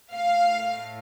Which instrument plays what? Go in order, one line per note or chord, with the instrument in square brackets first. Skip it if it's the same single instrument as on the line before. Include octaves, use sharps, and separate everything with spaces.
[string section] A2 A3 F5